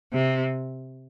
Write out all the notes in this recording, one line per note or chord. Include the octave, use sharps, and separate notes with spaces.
C3